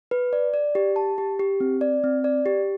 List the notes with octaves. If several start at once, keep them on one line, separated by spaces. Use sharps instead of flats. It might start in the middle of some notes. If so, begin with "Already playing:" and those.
B4
D5
D5
G4
A5
G4
G4
C4
D5
C4
D5
G4